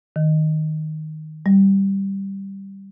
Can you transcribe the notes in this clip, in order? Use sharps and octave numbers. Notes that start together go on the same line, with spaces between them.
D#3
G3